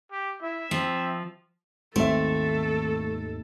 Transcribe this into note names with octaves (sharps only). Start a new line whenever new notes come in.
G4
E4 E5
F3 C4
G#1 D#2 A3 C4 A4 E5